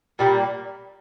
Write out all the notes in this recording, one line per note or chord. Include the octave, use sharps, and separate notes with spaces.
A#2 G3 A#3